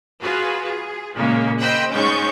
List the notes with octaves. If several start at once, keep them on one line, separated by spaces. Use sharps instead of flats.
F4 F#4 G#4 B4
G#4
A#2 C#3 G#3 A#3
C5 D#5 G5 B5 E6 F#6
G#2 G#3 C#4 C#6 G6